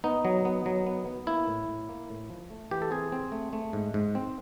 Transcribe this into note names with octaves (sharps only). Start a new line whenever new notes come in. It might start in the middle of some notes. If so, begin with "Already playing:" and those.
B3 D#4
F#3
B3
F#3
B3
B3
A#3 E4
A2
A2
A#3
A2
F3
A3
E3 G4
A4
C4 G#4
C4
A3
A3
G#2
G#2
C4